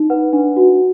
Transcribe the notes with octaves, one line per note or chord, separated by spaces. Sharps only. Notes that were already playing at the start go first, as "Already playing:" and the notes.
Already playing: D#4
B4 F#5
D4
F#4